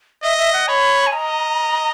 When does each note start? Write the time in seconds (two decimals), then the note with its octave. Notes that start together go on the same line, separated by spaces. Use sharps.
0.23 D#5 E5
0.38 E5
0.53 F#5
0.68 C#5 B5
1.07 G#5
1.13 D#5 A#5